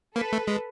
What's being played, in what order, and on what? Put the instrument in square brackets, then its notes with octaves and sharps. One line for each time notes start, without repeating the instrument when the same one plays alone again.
[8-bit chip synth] A#3 [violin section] A4 B4
[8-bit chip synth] A3
G#3